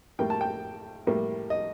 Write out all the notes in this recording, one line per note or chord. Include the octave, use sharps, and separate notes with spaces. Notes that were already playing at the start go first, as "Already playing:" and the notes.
A2 G3 A#3 G5
A5
G5
A2 G3 A#3
D#5